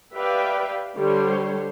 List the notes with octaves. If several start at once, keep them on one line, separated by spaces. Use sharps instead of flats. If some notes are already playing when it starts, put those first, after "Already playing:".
G4 B4 D5 E5 F5 G5
D3 G3 C5 C#5